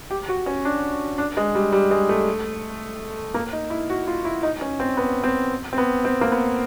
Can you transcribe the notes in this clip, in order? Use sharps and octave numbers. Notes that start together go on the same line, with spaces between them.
G4
F#4
C#4
D4
D4
G#3
G3
G3
G#3
A3
A#3
D#4
E4
F#4
F4
E4
D#4
C#4
C4
B3
C4
C4
B3
C4
A#3
B3